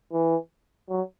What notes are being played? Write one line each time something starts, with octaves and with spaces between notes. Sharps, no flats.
E3
F#3